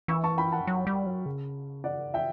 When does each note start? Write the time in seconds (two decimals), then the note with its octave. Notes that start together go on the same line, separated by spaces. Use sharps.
0.08 E3 C#6 E6
0.24 A5 C#6
0.38 G5 B5
0.52 F#5 A5
0.67 F#3
0.87 G3
1.06 F#3
1.26 C#3
1.84 D5 F#5
2.14 E5 G5